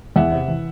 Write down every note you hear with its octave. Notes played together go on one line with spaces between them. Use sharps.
E2 E5 F#5
C3
E3